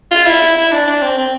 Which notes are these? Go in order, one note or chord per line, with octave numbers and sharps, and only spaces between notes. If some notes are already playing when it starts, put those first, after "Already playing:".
F4
E4
E4
E4
D4
D4
C4
C4